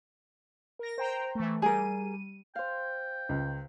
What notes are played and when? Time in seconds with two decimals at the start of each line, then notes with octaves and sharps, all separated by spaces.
0.79 A#4 A#6
0.98 C5 G5 A#5
1.35 E3 A3
1.62 G3 G#4 A#4 D#7
2.55 C5 F5 G5
3.29 C#2